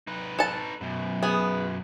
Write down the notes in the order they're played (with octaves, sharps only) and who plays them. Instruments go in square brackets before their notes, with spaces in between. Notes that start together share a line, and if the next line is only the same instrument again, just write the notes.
[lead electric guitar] D#4 B4
[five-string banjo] A4 A5
[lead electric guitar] F#2 B2
[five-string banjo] B3 G#4